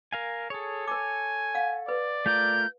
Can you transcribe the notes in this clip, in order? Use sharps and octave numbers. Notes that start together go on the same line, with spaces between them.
A#4 F5 G#5
G#4 A4 C#5
A#4 G#5 D6
F5 F#5
B4 D5
A3 F4 A#4 G6